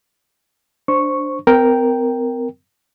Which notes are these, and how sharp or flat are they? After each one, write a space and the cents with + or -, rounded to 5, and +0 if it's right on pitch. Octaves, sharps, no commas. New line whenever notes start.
D4 +0 C5 +0 C#6 -5
C4 -40 A#4 +0 G5 +0